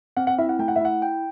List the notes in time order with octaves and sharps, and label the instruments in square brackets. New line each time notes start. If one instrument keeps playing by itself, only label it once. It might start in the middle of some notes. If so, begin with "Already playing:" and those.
[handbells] C4 [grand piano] F#5
[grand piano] F#5
[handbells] E4 [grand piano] E5
[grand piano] F#5
[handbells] A3 [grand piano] G5
[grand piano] F#5
E5
[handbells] E4 [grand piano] F#5
[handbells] G5